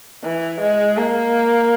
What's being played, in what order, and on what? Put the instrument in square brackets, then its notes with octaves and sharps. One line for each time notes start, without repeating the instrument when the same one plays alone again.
[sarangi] E3
G#3
A#3